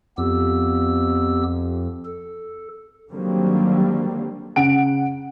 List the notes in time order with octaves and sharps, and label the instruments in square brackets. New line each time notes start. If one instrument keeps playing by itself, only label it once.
[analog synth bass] F2 [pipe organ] B3 G4 E6
[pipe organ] A4
[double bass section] D3 D#3 F#3 G3 A#3 C4
[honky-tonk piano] C#3 F#5 D7